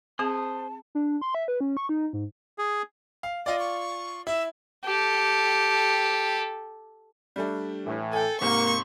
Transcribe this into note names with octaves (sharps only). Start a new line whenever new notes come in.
C4 G#4 C5 A5 D#6
D4
C6
E5
B4
C#4
C#6
D#4
G#2
G#4
F5
F4 D5 D#5
C#6
E4 E5
G4 A4
G3 A3 D4
A2 E3
A4 G5 G#5
G#2 C3 A#3 C5 C#6